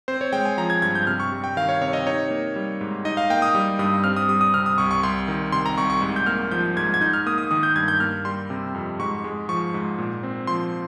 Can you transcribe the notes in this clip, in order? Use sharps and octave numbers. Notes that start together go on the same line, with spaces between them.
C4 C5
C#5
G#3 G5
G#5
F3 A#5
G#6
G2 G#6
G6
C3 F6
C#6
G3
G5
D#3 F5
C#5
C3 C#5
D#5
D#4 C#5
A#3
G3
G#2
D#4 D#5
F5
A#3 G5
D#6
G3
G2 D#6
C4 F6
D#6
G3 D#6
D#6
C3 F6
D#6
C2 C#6
C#6
C2 C6
D#3
C3 C6
A#5
C2 C#6
C#6
G#2
G6
A#3 F6
F3 G6
G#2 G#6
G#6
D#4 G6
F6
A#3 D#6
D#6
D#3 D#6
G6
G2 G#6
G6
A#3 F6
G3 C6
C3
F2
G#2 C#6
G#3
F3 C#6
G#2
A#2
C4
F3 C6